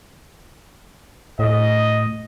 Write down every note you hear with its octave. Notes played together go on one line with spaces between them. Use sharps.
A2 D#5